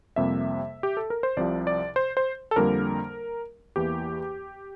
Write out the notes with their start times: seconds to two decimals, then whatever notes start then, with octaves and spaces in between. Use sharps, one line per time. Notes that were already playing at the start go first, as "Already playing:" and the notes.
0.16 F2 C3 G3 A#3 E5
0.83 G4
0.97 A4
1.10 A#4
1.23 C5
1.37 C2 C3 F3 D5
1.67 D5
1.96 C5
2.17 C5
2.51 A4
2.56 F2 D3 G3 A#3 A#4
3.76 E2 E3 A#3 G4